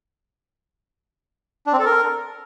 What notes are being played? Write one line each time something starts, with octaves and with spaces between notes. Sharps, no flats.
D4
C4
A4
A#4